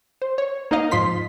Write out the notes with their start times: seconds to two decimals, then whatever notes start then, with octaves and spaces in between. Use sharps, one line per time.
0.22 C5
0.38 C#5
0.71 A#3 D#4 A#4 D#5 F5
0.91 G#2 F3 C6 B6